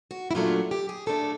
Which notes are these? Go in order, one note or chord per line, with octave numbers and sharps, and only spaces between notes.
F#4
E4
A#2 F#3 A3 D4 F4
G4
G#4
A#2 F#3 A3 D4 A4